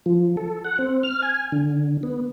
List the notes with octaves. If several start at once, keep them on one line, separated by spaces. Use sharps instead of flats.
F3
A4
F#5
C4
F6
G#5
D3
B3